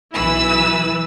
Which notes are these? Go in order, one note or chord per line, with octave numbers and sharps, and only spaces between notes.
B1 E3 E4 B4 E6